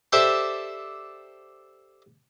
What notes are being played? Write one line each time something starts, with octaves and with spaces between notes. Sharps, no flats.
G4 A4 C5 D5 E5 A5